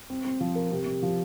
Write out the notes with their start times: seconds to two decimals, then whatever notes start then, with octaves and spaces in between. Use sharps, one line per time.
0.10 C4
0.25 C4
0.41 F3
0.55 A#4
0.72 C3
0.86 C3
1.03 F3